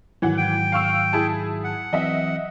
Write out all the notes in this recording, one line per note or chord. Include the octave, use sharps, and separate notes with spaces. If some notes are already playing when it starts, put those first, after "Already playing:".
G#2 D#3 E3 F#3 F#5
G5
F5 C#6 E6
E4 G#4 A5
F#5
E3 F#3 C4 D#5 E5